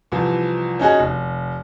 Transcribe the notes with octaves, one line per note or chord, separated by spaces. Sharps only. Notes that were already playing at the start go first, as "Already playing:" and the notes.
C2 E3 F3
C#4 D#4 F#4 G#4
F1